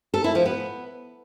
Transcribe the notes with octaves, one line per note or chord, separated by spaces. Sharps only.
A4
E4
F3
B3